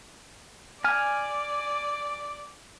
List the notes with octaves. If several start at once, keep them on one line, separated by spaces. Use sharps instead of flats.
D5 G#5 F6